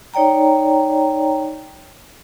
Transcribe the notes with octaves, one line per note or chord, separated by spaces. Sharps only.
D#4 C#5 D5 G5 A#5